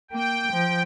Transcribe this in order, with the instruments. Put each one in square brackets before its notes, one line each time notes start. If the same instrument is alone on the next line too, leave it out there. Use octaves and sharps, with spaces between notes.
[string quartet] A#3 [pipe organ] G5
[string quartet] F3